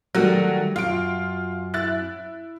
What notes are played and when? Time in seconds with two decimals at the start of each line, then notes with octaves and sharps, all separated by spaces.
0.15 D#3 F#3 G3 A3 F#4
0.76 F#2 F4 D7
1.74 E4 F#6 A6